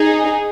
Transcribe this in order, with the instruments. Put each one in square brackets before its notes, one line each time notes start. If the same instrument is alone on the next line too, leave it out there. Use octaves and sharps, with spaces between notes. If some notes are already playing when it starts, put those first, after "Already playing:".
Already playing: [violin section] D#4 G#4